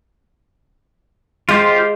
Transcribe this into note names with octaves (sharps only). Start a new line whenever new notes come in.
G#3 F4 G4 C5